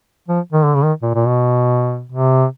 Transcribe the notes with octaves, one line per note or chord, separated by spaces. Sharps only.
F3
D#3
D3
C#3
D#3
A#2
A#2
B2
C3